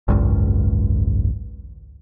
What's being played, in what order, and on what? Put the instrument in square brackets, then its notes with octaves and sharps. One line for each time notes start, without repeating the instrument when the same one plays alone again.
[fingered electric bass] G#1 C#2 F#2